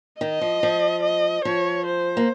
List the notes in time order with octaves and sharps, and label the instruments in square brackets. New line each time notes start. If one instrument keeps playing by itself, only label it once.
[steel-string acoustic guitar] D#3 [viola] D#5
[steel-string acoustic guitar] F3
F3
[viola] D#5
[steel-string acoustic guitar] F3 [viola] C#5
[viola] C5
[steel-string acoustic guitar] A#3